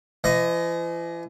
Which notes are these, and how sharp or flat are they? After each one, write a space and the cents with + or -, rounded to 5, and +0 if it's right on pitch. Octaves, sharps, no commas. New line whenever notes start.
E3 +45 D#5 +0